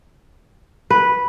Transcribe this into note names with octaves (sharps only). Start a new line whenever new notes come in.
B4